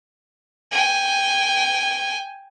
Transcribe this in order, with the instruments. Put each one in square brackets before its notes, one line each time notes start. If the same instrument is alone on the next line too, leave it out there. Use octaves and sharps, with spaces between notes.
[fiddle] G5 G#5